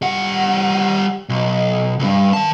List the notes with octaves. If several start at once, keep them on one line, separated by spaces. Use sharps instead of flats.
G3 F#5
B1
C#2 G2
D#3 A5